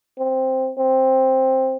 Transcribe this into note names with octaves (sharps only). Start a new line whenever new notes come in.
C4
C4